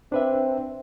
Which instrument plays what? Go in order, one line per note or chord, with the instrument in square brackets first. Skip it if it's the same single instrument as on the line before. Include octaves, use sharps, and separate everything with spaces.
[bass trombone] C4 [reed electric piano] D4 B4 E5